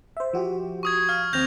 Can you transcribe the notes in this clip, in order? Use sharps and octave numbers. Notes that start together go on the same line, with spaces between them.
C5 E5
F3 F#4 G4
C#6 D#6 G#6
F5 F6
D#2 C4 G6 A#6 F7